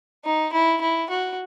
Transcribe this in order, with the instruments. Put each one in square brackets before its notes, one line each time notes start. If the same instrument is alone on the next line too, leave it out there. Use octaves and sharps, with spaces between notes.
[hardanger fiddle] D#4
E4
E4
F#4